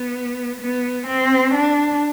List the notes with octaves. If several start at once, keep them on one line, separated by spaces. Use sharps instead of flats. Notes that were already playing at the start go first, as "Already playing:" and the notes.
Already playing: B3
B3
C4
D4